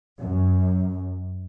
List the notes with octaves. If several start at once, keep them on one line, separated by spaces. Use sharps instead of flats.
F#2